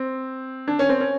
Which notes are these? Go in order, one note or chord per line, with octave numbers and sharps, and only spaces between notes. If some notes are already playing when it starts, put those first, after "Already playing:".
Already playing: C4
D4
C#4
C4
C#4